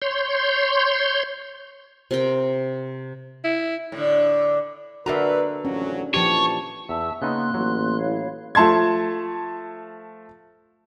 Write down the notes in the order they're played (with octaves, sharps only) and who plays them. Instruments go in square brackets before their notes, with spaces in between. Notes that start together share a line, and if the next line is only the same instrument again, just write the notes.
[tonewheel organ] C#5 C6 G6
[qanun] C3 A#4 G5
[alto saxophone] E4
[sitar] A2 D3
[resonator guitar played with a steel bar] D3 D4 A#5 [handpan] F#4 A#4 E5 [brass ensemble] B4
[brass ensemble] A1 F2 F#3 [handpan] C#4
[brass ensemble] A#2 E3 A5 [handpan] F3 G4 [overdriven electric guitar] C#5
[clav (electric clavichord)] E2 [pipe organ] E5 A5 E6
[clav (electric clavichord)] C#3 B3 D#4 [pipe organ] A#3 C6 F#6
[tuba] A1 [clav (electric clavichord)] F#3
[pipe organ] E4 C#5 F5
[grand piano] F3 A3 A5 C6 G#6